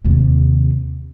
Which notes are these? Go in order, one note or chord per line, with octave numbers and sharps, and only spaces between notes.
D#2 C3